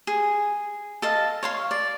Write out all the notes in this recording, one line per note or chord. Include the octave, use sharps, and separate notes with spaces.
G#4
A4 D#5 F5
C#5 F5 C6
D5